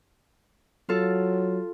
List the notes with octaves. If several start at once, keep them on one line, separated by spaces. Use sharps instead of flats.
F#3 F4 A4